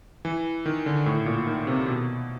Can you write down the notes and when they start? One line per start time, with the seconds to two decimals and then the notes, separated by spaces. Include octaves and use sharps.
0.25 E3
0.66 D#3
0.86 D3
1.06 A2
1.26 A#2
1.47 D#3
1.67 C3
1.88 B2